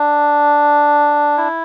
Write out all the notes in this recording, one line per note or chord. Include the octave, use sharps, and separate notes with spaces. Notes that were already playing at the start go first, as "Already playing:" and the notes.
Already playing: D4
E4